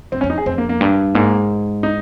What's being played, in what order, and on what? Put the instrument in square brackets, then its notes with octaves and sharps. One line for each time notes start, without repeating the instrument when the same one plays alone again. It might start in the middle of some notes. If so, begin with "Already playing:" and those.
[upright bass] G2 [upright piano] C4
[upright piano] C#4
[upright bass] F2
[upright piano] D#4
G#4
[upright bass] F2 [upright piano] C4
[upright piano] A#3
A#3
[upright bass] G2
[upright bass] G#2 [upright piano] A#3
[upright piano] D#4